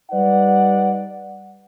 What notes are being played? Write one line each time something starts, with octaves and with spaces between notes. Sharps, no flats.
G3 D#4 B4 D5 F#5